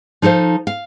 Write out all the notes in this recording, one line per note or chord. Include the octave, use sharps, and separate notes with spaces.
F3 D#4 A4 C5 F5
F5